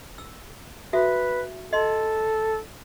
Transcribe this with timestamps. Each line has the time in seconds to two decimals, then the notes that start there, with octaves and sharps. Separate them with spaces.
0.18 E6
0.93 F#4 A4 B4 E5
1.73 A4 D#5 C6